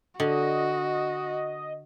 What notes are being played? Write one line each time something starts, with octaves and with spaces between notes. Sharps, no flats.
D3 F#4 D#5